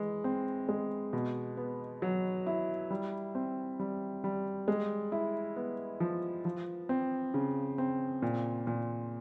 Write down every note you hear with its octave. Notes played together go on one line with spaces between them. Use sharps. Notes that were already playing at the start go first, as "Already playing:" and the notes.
Already playing: E3 G#3
C4
G#3
B2
B3
F#3
E4
G3
C4
G3
G3
G#3
E4
B3
F3
F3
C4
C#3
C4
A#2
A#2